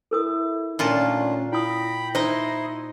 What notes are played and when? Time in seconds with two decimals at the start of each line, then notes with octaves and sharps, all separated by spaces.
0.11 E4 A4 A#4 D#6
0.79 A#2 D#3 A3 C#4 D4 F4 A5
1.52 E4 G5 B5 D#6 A#6
2.15 D#4 E4 C5 D#5 C6